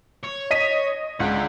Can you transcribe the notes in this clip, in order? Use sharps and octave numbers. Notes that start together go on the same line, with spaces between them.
C#5
D#5 B6 D#7
C#2 D4 F#5